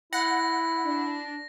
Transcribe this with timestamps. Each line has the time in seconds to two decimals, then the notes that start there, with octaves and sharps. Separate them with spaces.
0.13 E4 F#5 A#6
0.85 D4